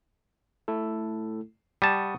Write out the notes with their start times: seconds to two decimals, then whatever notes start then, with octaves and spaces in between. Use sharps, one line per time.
0.68 A3 E4 A4
1.82 G3 F#5 A5 C#6 D#6